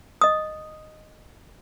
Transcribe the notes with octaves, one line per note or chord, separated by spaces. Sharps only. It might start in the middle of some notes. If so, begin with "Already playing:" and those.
D#5 D#6